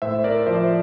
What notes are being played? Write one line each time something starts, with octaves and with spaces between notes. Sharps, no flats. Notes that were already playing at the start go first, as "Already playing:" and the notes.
A2 C5 E5
A#4 D5
F3 C5 E5